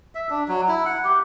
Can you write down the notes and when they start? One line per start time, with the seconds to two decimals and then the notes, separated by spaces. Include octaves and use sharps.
0.15 E5
0.30 D4
0.48 F#3
0.68 E4
0.85 F#5
1.04 G4